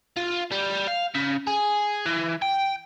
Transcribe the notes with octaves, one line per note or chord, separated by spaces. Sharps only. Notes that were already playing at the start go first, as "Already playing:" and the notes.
F4
G3
F5
C#3
G#4
E3
G5